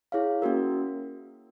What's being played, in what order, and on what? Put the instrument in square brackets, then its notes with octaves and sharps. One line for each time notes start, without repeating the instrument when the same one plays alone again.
[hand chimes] E4 G#4 C#5 F5
A#3 C#4 F#4 A#4